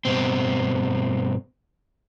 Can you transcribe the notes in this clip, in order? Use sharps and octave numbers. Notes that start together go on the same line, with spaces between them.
G2 B2 C4